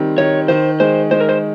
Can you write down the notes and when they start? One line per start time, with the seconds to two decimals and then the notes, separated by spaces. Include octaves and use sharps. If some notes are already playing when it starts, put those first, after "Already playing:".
Already playing: D#3 G3 C4
0.18 D#3 C#5
0.48 D#3 C5
0.80 G#3 C5
1.11 G#3 C5
1.20 A#4
1.29 C5